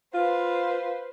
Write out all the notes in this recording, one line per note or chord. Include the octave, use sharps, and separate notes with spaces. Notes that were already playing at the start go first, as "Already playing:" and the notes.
F4 B4 C5